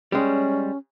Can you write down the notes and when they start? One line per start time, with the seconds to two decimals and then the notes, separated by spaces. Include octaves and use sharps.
0.12 G3 G#3 C#4